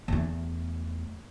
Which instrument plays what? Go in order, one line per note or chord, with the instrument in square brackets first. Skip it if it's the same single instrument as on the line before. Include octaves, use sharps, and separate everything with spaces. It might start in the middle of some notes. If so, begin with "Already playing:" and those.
[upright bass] E2 A3